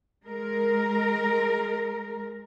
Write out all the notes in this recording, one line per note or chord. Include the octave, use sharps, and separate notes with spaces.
G#3 A#4